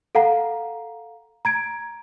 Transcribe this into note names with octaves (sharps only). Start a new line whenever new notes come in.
A4 F5 F#5 A#5
A#5 G#6 D7